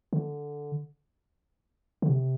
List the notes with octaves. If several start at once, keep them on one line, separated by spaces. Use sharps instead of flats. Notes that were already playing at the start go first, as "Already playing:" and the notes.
D3
D3
C3